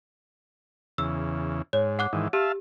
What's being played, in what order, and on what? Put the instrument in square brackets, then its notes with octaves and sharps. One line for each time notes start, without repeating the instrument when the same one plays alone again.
[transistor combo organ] E2 C#3 [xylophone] E6
[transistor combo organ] G#2 [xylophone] C#5
[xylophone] F#5 D6 F#6
[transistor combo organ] G#2 D#3 E3
[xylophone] G4 [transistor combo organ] E5 F5 A5